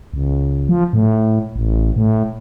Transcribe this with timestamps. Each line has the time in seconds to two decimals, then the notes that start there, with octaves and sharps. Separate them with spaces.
0.14 C#2
0.69 F3
0.93 A2
1.56 A1
1.96 A2